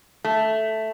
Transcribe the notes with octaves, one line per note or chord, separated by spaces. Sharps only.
A3